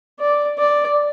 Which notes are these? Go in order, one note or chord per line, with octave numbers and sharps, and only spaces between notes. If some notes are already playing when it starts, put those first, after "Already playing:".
D5
D5